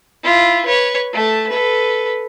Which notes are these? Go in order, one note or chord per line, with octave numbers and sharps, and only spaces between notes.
E4 F4
B4 C#5
A3 A5
A4 B4